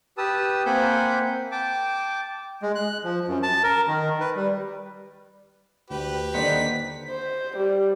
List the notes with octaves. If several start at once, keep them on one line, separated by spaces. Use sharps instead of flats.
G4 B4 A5 D#6 E6
A#3 C4 F#5 G#5 B5 G6
G5 A5 D6
G#3
F#6
F3
F#2
A5
A#4
D#3
B4
G3
D2 G4 B4
D#2 D3 D#4 C5 D5 F#5 B6
C5
G3